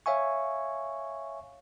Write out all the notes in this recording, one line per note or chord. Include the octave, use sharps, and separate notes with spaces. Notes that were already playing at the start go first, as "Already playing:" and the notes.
C#5 E5 F5 G#5 C#6